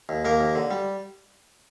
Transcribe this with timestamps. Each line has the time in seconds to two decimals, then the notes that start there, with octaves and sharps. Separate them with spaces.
0.09 D#2
0.25 D#2 A#3 A#4
0.41 D#2
0.55 D3
0.71 G3